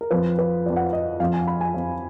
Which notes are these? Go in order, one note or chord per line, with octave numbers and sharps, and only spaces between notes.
A#4
F2 F3 B4
B4
F2 F3 D5
F#5
F5
D#5
F2 F3 F5
G#5
B5
G#5
F2 F3